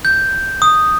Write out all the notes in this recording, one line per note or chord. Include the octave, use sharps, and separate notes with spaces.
G6
D#6